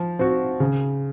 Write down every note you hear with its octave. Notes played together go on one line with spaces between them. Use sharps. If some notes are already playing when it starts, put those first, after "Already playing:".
Already playing: F3
C4 F#4
C#3